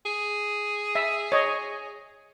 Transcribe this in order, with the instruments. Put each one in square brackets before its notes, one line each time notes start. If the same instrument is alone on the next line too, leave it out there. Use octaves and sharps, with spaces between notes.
[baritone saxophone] G#4
[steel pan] E5
C#5 D#5